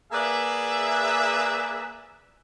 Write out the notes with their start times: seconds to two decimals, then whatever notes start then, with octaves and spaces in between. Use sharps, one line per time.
0.11 A#3 G#4 B4 D5 E5